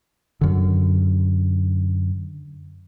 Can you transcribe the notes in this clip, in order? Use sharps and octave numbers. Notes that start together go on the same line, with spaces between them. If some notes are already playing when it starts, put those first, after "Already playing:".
F#2 D3